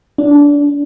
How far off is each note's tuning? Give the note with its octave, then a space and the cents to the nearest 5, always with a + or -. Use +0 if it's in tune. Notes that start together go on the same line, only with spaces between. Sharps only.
D4 -20